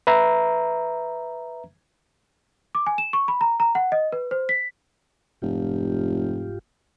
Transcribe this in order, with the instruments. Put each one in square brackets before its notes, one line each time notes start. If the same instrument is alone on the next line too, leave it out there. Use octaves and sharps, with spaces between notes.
[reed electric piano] B4 E5 A#5
[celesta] D6
G#5
E7
C#6
B5
A#5
A#5
F#5
D#5
B4
C5
B6
[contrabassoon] F1 [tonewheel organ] G#2 F4 G4